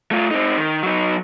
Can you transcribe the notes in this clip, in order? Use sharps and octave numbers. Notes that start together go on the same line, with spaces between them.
A3 F4
C4 D#4
D#3
F#3 D#4